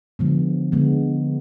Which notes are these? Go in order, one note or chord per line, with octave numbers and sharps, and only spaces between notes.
D3 F3 G#3 B3
D3 G#3 B3